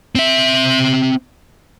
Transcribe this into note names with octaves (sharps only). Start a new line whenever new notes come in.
C4 E5